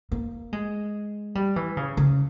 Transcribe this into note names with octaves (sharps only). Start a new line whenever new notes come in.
A#3
G#3
G3
E3
C#3
C#3